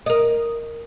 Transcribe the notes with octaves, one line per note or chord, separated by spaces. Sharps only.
A#4 D#5